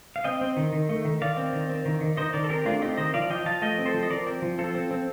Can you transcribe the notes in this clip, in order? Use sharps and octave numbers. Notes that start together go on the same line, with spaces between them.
F5
C4 D#5 G5
C4
D#3
D#3
A3
D#3
D#3 D5 F5
C4
D#3
C4
D#3
D#3
D#3 C5 D#5
D#3 A#4 D5
A4
C4 G4 A#4
A3 D4 F4
C4 D#4 G4
D#3 C5 D#5
F3 D5 F5
F3 D#5 G5
F3 F5 A5
A3 D#5 G5
C4
A4 C5
F3
D#5
F3 A#4 D5
C4
F3
C4 F4 A4
C4
C4